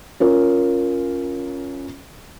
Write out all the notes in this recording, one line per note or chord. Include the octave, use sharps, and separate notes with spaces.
C#4 F4 A#4